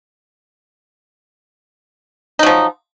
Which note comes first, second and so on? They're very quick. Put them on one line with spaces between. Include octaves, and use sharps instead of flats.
D#4 F#3 F3